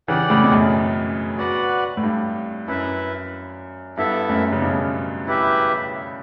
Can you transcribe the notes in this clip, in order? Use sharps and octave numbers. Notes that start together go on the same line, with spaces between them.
C#3 E3 G4 D5 F#5
A2 C#3
B2
F#2 A2
F#4 B4 D5 F#5
A2
G2
F#2 E4 B4 E5
G2 B3 E4 A4 E5
F#2 A2
C#3
G2 B2
E4 G4 B4 E5